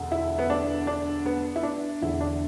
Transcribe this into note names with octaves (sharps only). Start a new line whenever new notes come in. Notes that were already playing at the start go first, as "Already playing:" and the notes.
Already playing: E1 D2 D3
E4
B3
D4
D4
B3
E4
D4
E1 E2 D3 E4
D4